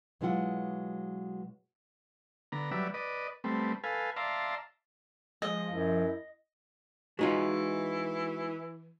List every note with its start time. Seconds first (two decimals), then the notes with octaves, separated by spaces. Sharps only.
0.21 B2 F#3 G#3 E4 F4 F#5
2.52 D3 B3 A#5
2.71 F#3 G3 B4 D5 E5
2.94 B4 D5 D#5
3.44 G3 A3 B3 C4
3.84 A4 B4 F5 G#5
4.16 D5 E5 F5 A5 A#5 C6
5.42 F3 G#3 D#5
5.72 F#2 E4
7.19 E3 G#3 D#4 F4 F#4